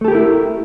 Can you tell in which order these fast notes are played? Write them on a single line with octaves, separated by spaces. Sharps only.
A3 A4 G4 A#4 E4